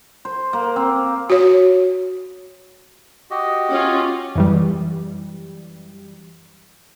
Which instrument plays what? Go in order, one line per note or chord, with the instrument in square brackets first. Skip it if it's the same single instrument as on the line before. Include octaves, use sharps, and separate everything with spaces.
[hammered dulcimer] C5
A#3
C4
[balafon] F#4 C#5
[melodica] F#4 G4 D#5
[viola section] C#4 F4
[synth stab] F#2 E3 G3